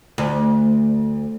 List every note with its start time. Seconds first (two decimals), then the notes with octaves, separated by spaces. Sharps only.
0.18 D2